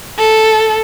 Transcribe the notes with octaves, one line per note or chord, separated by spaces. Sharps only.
A4